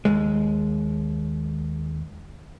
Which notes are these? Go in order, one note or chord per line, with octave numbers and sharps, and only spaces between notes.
D#2 G#3